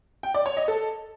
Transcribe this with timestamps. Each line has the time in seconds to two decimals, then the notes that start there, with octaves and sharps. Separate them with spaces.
0.23 G5
0.34 D5
0.46 C#5
0.57 D#5
0.68 A4